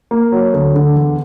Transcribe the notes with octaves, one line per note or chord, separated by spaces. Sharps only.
A#3
F#3
D2
D3
E2